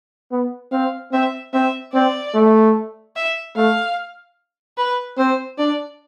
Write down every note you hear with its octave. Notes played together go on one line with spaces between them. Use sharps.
B3
C4 F5
C4 E5
C4 E5
C4 D5
A3
E5
A3 F5
B4
C4 C5
D4 D5